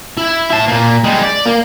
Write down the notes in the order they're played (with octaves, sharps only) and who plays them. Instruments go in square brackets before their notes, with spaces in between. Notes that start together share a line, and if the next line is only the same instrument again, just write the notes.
[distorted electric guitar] E4
E4 A5
A#2 A#3
G3 G#3
D5
A#3